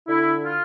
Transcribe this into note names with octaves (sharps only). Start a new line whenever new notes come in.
D3 E4
F4